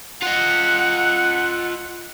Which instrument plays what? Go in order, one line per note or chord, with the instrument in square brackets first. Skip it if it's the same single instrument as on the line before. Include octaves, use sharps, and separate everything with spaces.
[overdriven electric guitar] F4 D#5 [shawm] F#5